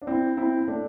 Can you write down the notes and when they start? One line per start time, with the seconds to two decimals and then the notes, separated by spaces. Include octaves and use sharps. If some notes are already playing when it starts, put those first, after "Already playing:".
0.02 D4
0.07 C4 E4
0.37 C4 E4
0.60 C4
0.68 A3 D4